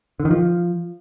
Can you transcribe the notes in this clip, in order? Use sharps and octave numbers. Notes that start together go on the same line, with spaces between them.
D3
D#3
F3